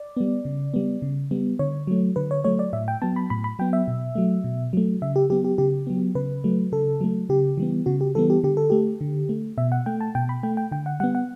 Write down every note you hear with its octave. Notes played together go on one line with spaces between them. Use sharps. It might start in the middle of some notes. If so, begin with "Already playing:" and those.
Already playing: D5
G3 B3
C#3
G3 B3
C#3
G3 B3
D3 C#5
F#3 A3
D3 B4
C#5
F#3 A3 C#5
D5
A2 E5
G5
F#3 B3 A5
B5
A2 B5
B5
F#3 B3 G5
E5
B2
F#3 A3
B2
F#3 A3
C#3 E5
G4
F#3 B3 G4
G4
C#3 G4
F#3 B3
C#3 B4
F#3 A3
C#3 A4
F#3 A3
C#3 G4
E3 G3 B3
C#3 F#4
G4
E3 G3 B3 A4
G4
D3 G4
A4
A3 G4
D3
A3
B2 E5
F#5
A3 G5
A5
B2 G5
B5
A3 G5
G5
D3 G5
F#5
G3 B3 F#5
F#5